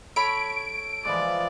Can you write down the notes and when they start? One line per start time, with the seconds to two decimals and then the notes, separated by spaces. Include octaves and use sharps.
0.16 A4 C#5 B5 D7
1.05 E3 F3 G#3 D5